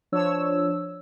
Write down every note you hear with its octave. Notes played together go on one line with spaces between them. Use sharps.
F3 D4 C#5 E6